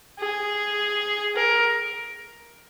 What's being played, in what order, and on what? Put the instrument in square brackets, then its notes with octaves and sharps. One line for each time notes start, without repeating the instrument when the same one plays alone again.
[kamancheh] G#4
A#4